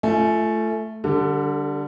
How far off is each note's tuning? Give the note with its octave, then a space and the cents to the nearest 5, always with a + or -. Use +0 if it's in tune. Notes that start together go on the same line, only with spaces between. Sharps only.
A3 +0 F4 -30 G#5 +30
D3 +0 G3 +0 A4 +40